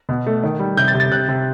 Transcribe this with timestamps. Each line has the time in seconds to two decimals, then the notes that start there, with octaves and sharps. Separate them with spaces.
0.09 B2
0.26 A3
0.43 D#3
0.59 G3
0.77 C3 G6
0.88 A6
0.94 C3
1.00 A6
1.11 C3 F#6
1.28 C3